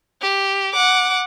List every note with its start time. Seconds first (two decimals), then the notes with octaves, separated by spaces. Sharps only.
0.21 G4
0.73 F#5 D6